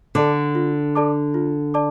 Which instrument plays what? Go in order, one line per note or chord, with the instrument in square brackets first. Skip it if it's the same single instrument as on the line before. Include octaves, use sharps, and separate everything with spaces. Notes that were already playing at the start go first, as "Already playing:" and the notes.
[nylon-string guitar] D3 [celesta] A4 D5 A5 D6
[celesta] F4
A4 D5 A5 D6
F4
D5 A5 D6